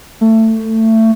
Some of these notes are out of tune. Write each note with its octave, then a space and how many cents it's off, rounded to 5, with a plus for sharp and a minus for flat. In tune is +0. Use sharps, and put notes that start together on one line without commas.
A3 +20